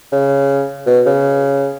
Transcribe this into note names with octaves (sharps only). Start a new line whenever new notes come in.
C#3
B2
C#3